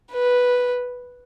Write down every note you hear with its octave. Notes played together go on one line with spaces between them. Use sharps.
B4